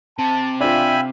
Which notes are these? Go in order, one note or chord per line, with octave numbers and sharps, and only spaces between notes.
C3 A5
D4 F4 E5 F5 G5 G#5 B5